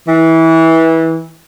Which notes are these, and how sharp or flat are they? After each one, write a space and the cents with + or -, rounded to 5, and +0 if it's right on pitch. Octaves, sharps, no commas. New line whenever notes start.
E3 -20